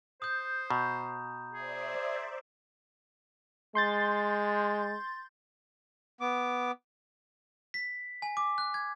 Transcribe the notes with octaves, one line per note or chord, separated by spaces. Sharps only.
C5 D#6 G6
B2 A#5
G#4 C5 D5 E5
G#3 C6 G6 A6
B3 D6
B6
G#5
D6
F#6
G#6